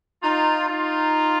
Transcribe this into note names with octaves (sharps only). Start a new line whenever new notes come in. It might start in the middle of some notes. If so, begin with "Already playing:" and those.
D#4 F4
D#4 F4